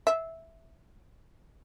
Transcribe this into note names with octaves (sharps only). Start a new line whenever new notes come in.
E5